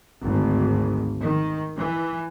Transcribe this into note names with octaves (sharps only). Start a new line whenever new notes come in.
G#1 D2
D#3
E3